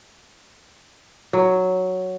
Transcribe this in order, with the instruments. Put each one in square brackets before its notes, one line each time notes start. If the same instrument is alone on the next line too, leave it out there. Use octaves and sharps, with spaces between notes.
[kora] F#3